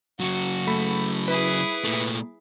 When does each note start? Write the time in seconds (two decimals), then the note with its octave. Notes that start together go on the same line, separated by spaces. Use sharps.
0.20 C#3 F#3 F#4
0.67 A3 B5
1.28 E4 G#4 B4
1.84 A#2 A3